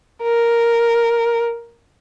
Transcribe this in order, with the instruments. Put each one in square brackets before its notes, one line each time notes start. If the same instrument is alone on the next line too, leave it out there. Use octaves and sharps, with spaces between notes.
[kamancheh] A#4